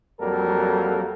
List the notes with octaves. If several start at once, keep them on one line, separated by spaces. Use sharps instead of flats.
F2 F#3 G3 A#3 A4 A#4